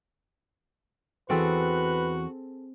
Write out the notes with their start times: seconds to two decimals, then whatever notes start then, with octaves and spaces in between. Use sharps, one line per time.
1.30 E2 E3 C4 F#4 G#4 A4 B4